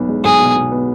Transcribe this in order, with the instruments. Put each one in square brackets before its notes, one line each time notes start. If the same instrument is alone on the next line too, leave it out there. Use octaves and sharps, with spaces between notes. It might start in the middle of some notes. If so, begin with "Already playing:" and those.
Already playing: [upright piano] B1 B3
G#3
[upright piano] B1 [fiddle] G#4
[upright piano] B2
B2
B3